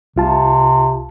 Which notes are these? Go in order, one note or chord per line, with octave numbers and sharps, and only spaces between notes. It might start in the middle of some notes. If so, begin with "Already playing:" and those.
C2 C3 F4 A5